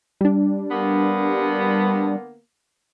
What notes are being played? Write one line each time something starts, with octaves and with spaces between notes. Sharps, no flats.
G3 D4
D3 A#3 B3